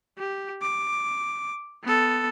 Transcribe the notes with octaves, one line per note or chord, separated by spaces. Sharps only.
G4
D6
B3 A4